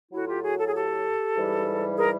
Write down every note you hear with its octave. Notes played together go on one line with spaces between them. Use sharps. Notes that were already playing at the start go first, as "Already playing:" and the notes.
A2 F#3 E4 F#4
F4 G4
F#4 G#4
A4
G#4
G4 A4
G#2 E3 G3
G#4 A#4